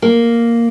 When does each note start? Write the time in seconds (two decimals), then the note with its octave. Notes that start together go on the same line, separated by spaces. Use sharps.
0.02 A#3